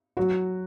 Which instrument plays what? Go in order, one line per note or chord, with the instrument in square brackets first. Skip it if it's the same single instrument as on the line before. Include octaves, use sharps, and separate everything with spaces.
[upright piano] F#3 [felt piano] F#4